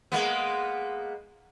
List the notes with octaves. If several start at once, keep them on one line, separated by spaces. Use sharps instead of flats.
G#3 A#3 B3